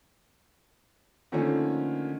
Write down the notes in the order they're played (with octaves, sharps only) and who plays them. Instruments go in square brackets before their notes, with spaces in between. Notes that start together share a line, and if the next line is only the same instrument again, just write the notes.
[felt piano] D3 D#3 F3 A3 A#3 C#4